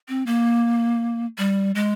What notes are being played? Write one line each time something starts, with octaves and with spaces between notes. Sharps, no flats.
C4
A#3
G3
G#3